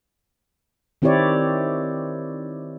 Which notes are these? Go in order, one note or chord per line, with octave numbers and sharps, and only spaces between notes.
D#3 C4 E4 G4 C#5 D5